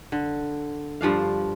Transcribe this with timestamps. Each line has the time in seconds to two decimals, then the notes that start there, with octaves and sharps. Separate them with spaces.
0.12 D3
1.01 G2 F3 D4 F5